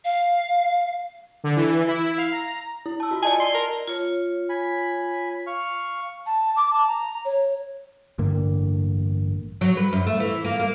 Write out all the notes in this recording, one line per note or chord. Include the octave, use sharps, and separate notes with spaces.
F5
D3
E3
E4
F5
A#5
E4
A5 E6
F4 F#4
D5 D#5 G#5 A5
C6
A#4
F4 C#5
G#5 B5
F5 C#6
A5
D6
A5
A#5
C#5
A1 G2 D3 A#3
F#3
B4
F#2
A3
E3
A#3
A#3